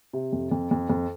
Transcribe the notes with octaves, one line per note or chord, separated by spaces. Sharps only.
C3
F2
F2
F2
F2